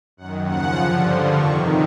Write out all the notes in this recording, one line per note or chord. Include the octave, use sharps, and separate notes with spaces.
F#2 D#3 F#5
D#2 C#3 F3 F#5
G2 D3 F3
G2 D3 F3 C6
F2 C3 D#3 C#6